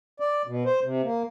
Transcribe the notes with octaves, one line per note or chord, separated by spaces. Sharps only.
D5
B2
C5
C3
A#3